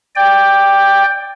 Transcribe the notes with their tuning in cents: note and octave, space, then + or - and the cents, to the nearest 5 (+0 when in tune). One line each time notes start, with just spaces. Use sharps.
D5 +0 G5 +10